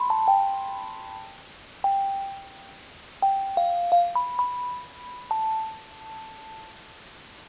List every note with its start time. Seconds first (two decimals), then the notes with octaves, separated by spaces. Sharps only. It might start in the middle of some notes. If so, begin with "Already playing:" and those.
Already playing: B5 C6
0.10 A5
0.28 G5
1.84 G5
3.22 G5
3.57 F5
3.92 F5
4.15 B5
4.39 B5
5.31 A5